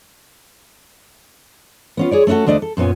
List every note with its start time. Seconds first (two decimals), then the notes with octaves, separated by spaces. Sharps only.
1.97 B3 C#4 F4
2.11 G#4 C#5 D5
2.27 A3 C#4 D4 F#4 A4
2.46 D2 A3 D4 D5 D#5
2.62 A4
2.77 F#2 A#2 B3 C#4 G#5